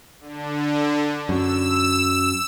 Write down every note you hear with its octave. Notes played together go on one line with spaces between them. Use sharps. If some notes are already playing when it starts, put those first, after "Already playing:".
D3
F#2 E6